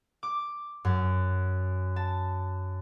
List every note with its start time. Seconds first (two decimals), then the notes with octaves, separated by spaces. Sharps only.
0.23 D6
0.85 F#2
1.96 A5